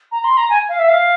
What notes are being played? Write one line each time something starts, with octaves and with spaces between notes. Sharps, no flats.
A#5
C6
A#5
G#5
F5
E5
F5